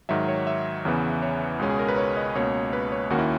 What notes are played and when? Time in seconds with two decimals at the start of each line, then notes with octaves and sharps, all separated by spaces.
0.09 G#2 D#3 F#3 E5
0.28 C#5
0.47 E5
0.85 E2 C#3 E3 B3
1.22 C#5
1.59 C#2 B2 G#3 C#4
1.70 G#4
1.79 A#4
1.88 B4
1.98 C#5
2.17 D#5
2.35 C#2 B2 A#3 C#4 C#5
2.73 B4
2.92 C#5
3.10 D#2 D#3 A#3 C#4 F#4
3.19 E4